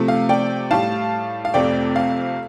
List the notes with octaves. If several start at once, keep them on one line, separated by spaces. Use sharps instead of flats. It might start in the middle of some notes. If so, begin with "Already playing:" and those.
Already playing: C3 F3 A3
F5
D5 G5
A2 G3 F5 A5
F5
F2 C3 A3 D5 G5
F5